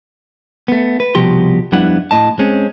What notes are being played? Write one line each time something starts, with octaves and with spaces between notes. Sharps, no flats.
A3 B3
B4
C2 B2 F3 F#4 G4 C6
F2 G3 B3 D4 E4 F#5
A2 D#5 A5
G#3 C4 C#4